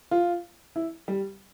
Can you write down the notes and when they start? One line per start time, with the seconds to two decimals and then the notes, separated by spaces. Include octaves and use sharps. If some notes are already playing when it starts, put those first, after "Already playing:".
0.11 F4
0.76 E4
1.08 G3